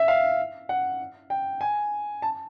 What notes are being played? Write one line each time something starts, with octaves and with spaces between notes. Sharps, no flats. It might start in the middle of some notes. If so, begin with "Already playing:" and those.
Already playing: E5
F5
F#5
G5
G#5
A5